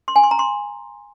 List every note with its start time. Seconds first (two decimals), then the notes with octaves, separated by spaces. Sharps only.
0.08 C6
0.16 G#5
0.23 C6
0.31 A#5
0.39 C6